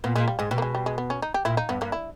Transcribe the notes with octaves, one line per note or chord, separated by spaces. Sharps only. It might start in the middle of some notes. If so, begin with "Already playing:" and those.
A#2 B3
A#2 G#3
G3
G#2 G#3
B2 G3
A#3
G#3
G3
G#3
B3
C#4
D#4
G4
A#2 E4
D#4
G2 B3
G2 A#3
E4